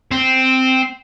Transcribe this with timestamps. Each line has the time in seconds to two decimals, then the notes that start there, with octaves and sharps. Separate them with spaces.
0.12 C4